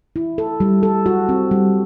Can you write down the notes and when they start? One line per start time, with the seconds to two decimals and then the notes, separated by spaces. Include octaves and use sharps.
0.16 E4
0.38 A4
0.60 G3
0.83 A4
1.06 F#4
1.29 C4
1.51 G3